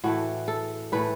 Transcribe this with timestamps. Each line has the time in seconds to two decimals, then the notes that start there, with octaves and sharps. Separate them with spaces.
0.04 A2 E3 A3 F#4
0.48 A4
0.92 A2 E3 A3 B4